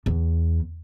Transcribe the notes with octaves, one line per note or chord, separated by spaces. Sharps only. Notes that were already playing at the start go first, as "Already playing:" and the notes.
E2